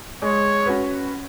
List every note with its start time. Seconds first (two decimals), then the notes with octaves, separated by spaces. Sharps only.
0.22 G#3 C#5
0.66 C#4 F#4 B4